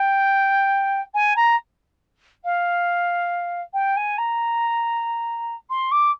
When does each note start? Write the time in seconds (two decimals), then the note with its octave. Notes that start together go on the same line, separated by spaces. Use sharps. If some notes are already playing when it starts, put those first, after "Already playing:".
Already playing: G5
1.14 G#5
1.36 A#5
2.44 F5
3.73 G5
3.96 G#5
4.18 A#5
5.69 C6
5.91 D6